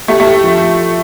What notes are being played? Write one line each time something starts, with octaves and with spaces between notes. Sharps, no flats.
A3 G4
A3
G4
F3